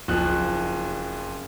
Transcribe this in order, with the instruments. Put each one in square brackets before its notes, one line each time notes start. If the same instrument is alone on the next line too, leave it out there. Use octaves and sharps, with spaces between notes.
[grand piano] F#1 F2 F#6